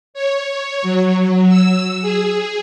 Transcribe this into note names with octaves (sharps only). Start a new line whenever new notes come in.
C#5
F#3
E6
G#4